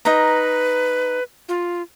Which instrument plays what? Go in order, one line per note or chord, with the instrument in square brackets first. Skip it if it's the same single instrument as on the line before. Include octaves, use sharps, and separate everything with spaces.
[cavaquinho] D#4 A#5 [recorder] B4
[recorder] F4